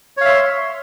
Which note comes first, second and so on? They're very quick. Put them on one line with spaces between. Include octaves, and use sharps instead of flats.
C#5 F5 E5 C6